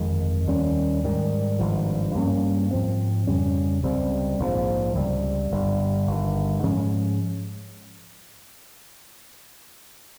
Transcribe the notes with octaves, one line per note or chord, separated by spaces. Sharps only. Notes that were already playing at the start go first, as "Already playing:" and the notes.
Already playing: G1 F2 D#3 G#3
D#2 D#3 G3 C#4
G#2 D#3 G3
G#1 G2 F3
G2 G3 A#3 C#4
G#2 F3 C4
F2 C#3 G3 C#4
C#2 C3 G3 C4
A#1 G#2 F3
C#2 C3 G3
G1 G2 G3
G1 G2 D#3
G#2 F3 G#3 C#4